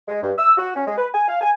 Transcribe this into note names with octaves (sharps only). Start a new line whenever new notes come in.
G#3
G2
E6
F#4
C#4
G#3
B4
G#5
F5
G#5